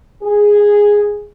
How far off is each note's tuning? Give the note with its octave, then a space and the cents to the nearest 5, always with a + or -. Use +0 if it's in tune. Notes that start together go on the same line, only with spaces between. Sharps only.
G#4 -5